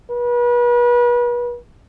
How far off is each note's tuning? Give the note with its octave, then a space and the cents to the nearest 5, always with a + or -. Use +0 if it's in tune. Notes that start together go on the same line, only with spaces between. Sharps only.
B4 -35